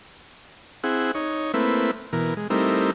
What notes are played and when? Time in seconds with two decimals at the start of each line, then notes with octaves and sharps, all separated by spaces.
0.84 C4 E4 G#4 F#5
1.15 D#4 C#5
1.54 A3 A#3 C4 E4 B4
2.13 B2 E3 A#4
2.37 G#3
2.50 G3 A3 C4 D#4 E4 A#4